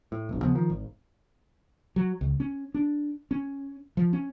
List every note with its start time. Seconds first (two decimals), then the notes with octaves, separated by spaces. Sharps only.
0.12 A2
0.29 E1 A#1
0.41 D#2 C#3 F3 B3
0.55 D#3 F3
0.70 G#1
1.96 F#3
2.21 C#2
2.40 C#4
2.74 D4
3.31 C#4
3.97 F3
4.13 C#4